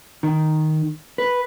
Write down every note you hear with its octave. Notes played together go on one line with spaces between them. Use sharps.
D#3
B4